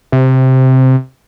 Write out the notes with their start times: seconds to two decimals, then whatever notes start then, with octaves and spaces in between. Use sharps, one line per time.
0.12 C3